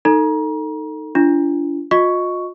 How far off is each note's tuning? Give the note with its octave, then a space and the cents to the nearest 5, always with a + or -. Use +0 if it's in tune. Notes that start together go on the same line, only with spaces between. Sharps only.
D#4 +0 A4 +20 A#5 +30
D4 -30 F4 -45
F4 +45 D#5 +0 C#6 +10